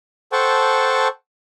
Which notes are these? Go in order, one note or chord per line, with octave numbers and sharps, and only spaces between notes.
A4 C5 F#5 G5 A5 C#6